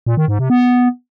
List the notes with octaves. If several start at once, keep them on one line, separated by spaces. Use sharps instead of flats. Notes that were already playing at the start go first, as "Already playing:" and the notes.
A#2
D#3
G#2
C3
B3